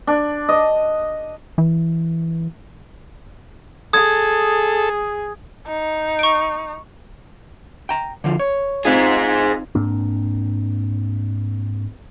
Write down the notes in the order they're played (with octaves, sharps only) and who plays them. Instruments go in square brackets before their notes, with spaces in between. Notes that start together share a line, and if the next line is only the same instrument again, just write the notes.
[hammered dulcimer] D4
D#5
[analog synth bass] E3
[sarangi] G#4 [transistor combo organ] A4 [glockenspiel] D#6 G#6
[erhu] D#4
[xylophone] C#6 D7
[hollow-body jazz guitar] G5 A#5
D3 F3 F4
C#5
[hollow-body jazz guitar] C4 D#4 F4 [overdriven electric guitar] G#4 C5
[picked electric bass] G#2 A#3 C4 D4